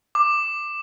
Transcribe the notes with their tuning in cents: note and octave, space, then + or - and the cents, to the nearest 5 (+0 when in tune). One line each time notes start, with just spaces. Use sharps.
D6 +15